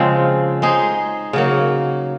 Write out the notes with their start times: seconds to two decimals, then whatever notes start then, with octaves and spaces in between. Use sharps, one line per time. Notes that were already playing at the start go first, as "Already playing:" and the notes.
Already playing: C#3 F3 G#3 C4
0.62 G#3 D#4 G#4 C5
1.33 C#3 F#3 A#3